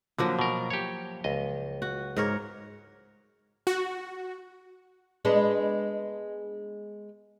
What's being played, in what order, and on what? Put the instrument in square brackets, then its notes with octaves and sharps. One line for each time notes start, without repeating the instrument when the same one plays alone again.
[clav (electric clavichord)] D3 [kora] F3 F#3 A#3
[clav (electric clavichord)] B2 A#4
G4 C#5
C#2 D#5
[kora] F#4
G#2 A#4 C#5
[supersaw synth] F#4
[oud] G#3 B3 D4